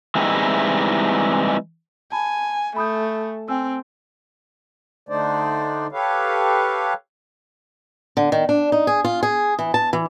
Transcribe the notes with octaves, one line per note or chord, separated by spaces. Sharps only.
E3 G3 G#3 C4 D#4 E4
G#5 A5 B5
A3 B5 D#6 G6
C4 G5 G#5 E6
D3 A3 D4 D#4 C5 D5
G4 A4 B4 C#5 F5
D3
D#3
D4
D#4
G#4
F4
G#4
E3
A5
E3